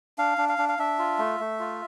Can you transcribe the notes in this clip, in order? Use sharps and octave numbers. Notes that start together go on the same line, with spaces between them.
D4 F5
D4
F5
D4
F5
D4 E5
F4
A3
A3
F4